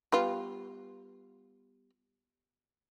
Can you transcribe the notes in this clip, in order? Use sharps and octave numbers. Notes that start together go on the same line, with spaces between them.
G3 B3 F4